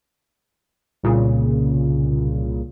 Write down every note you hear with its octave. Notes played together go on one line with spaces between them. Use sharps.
C2 A#2 C#3